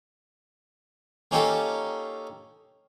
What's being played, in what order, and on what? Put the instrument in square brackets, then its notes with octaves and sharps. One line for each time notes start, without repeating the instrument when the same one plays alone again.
[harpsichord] A#3 C#4 D#4 F4 G4 A4